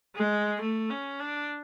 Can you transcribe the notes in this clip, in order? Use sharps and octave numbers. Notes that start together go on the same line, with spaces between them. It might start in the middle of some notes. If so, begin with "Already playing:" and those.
G#3
A3
C#4
D4